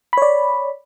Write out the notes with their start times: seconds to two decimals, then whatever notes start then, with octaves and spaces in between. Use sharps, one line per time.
0.13 B5
0.17 C#5
0.22 D5